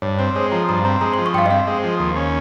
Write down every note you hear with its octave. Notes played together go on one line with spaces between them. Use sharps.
G2 C#5
C4 C5
G#3 C#5
F3 A#5
G2 A#5
C4 A#5
G#3 A#5
F3 C6
C#6
G2 F5 G5
D#5
C4 F5
G#3
F3
D#2
C#4